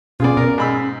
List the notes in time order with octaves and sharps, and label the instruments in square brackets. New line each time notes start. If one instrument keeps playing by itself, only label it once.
[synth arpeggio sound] B2 B3 [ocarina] C#4 [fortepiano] F4 G#4 D5
[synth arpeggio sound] B2 [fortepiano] A#4
[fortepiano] G#2 B5 E6